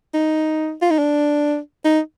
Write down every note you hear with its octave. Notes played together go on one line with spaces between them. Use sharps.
D#4
F4
D#4
D4
D#4